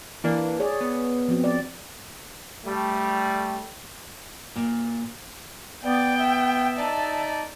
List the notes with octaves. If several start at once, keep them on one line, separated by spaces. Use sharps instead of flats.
E3 A#3 D4
G#4 C#5 D5
B3
F3 C4 F#4
D5
G3 A3
A#2
B3 D5 G5
E5
D#4 D5 A5